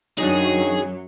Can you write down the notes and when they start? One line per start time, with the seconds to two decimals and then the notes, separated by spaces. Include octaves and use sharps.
0.18 F#2 D#3 F#3 D4 D#4 G#4 C#5